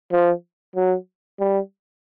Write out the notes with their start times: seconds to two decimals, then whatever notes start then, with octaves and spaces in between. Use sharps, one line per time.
0.12 F3
0.75 F#3
1.40 G3